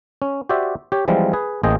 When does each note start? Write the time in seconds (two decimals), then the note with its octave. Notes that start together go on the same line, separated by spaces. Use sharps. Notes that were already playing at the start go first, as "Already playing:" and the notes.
0.22 C#4
0.49 F#4 G4 C5 D5 E5
0.92 G4 C#5
1.08 E3 F3 G3 G#3 C4 F4
1.33 G#4 B4
1.63 A1 A#3 G#4 C5 D#5 G5